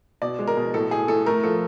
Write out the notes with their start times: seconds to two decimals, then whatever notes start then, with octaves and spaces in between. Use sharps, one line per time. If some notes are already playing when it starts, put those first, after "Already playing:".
0.22 B2 D5
0.39 G#3
0.47 A#4
0.57 B2
0.74 A2 A4
0.91 A2 G#4
1.08 A2 A4
1.26 A3 A#4
1.43 F3 A4